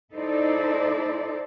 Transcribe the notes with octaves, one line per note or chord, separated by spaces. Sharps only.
D#4 E4 A4 C5 D5